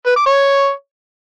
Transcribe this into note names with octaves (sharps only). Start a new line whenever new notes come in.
B4
D6
C#5